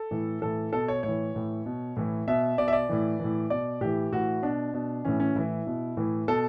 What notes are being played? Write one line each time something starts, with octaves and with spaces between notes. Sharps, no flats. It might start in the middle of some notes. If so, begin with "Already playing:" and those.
Already playing: A4
A2 E3
A2 E3 A4
B2 A4
C#5
A2 C#5
E3
A2 E3
B2
A2 E3
B2 E5
B2 D5
E5
D5
A2 E3
A2 E3
B2 D5
A2 E3 G4
A2 E3 F#4
B2 D4
B2
A2 E3 C#4
C#4
A2 E3 E4
B2
A2 E3
B2 A4